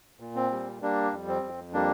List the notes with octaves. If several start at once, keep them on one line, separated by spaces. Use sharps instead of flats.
A#2
C4
G3
G3 A#3 D4
F2
C4
F2
G3 A#3 D4